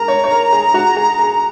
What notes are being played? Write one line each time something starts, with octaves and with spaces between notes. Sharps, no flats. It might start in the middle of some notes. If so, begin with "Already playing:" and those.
Already playing: G#4 A#4 A#5
C#5
C#5
A#4
G#4
F#4
G#4
G#4